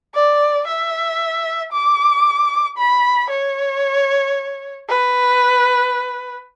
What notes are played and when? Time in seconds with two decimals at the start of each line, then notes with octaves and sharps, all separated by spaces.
0.14 D5
0.67 E5
1.72 D6
2.78 B5
3.30 C#5
4.89 B4